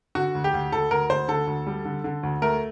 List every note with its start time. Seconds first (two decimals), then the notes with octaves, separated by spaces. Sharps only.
0.15 D3 F#4
0.35 D2
0.44 G4
0.54 D2
0.72 D2 A4
0.91 D2 A#4
1.10 D2 C5
1.28 D3 A4
1.47 D2
1.67 G3
1.85 D3
2.04 D3
2.23 D2
2.42 A3 A#4